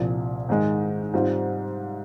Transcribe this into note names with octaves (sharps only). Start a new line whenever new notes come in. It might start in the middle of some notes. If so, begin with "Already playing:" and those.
Already playing: C2 A#2 F3
G#2 D#3 G#3
G#2 G3 C4 F4